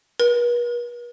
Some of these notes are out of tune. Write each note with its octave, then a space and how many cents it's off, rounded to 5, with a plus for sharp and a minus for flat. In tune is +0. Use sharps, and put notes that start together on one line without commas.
B4 -45